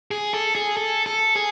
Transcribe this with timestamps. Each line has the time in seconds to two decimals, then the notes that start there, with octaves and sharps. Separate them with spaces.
0.11 G#4
0.34 A4
0.55 G#4
0.77 A4
1.06 A4
1.36 G#4